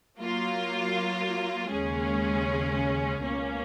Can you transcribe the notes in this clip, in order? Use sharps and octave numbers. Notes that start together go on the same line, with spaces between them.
F#3 A#3 F4
D#2 C#3 G#3 C#4 G#4
C#2 B2 A#3 C#4